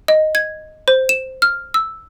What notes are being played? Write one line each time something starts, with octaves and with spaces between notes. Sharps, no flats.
D#5
G#6
C5
E7
F6
E6